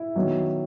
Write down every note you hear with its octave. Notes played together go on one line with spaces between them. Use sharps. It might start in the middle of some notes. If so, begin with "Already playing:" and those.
Already playing: E4
D#3 F#3 B3